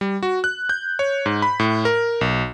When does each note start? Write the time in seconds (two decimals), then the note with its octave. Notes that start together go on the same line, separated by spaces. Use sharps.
0.01 G3
0.23 F#4
0.44 F#6
0.69 G6
0.99 C#5
1.26 G#2
1.42 B5
1.59 A2
1.85 A#4
2.21 B1